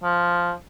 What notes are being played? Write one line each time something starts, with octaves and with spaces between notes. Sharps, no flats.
F3